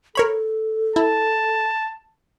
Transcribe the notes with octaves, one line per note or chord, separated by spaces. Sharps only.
A4 A#4 C#5 B5
E4 A5